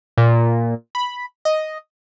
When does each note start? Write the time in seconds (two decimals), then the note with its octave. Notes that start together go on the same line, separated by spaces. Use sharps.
0.17 A#2
0.95 B5
1.45 D#5